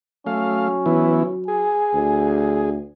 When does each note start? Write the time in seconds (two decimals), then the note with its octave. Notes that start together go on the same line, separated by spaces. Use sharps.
0.27 F#3 A3 C#4 F5
0.86 E3 B3 E4
1.48 G#4 G#5
1.94 D2